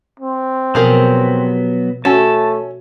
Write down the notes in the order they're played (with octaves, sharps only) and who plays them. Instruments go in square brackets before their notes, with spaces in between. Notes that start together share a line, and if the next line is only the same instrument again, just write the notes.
[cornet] C4
[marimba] B2 F3 [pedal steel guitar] F#3 B3 [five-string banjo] G4 G#4 A#4
[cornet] A3 [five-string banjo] C#4 [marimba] F#4 F#5 E6 [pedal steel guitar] A5